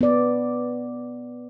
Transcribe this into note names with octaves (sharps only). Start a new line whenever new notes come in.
B3 D5